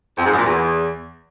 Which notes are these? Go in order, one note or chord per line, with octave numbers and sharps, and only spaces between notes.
F2
G#2
F#2
A#2
E2